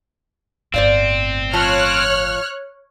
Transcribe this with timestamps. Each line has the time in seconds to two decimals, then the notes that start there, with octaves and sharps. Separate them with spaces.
0.74 G1 A2 C4 C5 D5 F5
1.53 F3 F4 C#5 F6 F#6